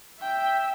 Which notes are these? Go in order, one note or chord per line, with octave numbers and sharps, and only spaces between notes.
E5 G5